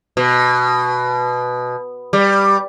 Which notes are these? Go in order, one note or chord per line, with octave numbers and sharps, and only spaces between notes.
B2
G3